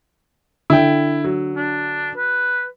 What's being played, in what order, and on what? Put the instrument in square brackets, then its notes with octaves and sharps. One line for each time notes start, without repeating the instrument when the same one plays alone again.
[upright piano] D3 [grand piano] E4 G5
[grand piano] F#3
[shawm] D4
B4